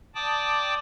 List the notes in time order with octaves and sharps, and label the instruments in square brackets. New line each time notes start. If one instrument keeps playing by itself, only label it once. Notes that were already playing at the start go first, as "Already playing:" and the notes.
[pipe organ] D5 G5 A5 D6 D#6